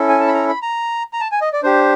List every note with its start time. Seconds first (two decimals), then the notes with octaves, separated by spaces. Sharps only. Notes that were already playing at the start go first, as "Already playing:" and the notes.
Already playing: C#4 E4 A4
0.09 G#5
0.20 A5
0.28 B5
0.34 A#5
0.48 B5
0.62 A#5
1.13 A#5
1.20 A5
1.32 G#5
1.41 D#5
1.53 D5
1.63 D4 G4 C5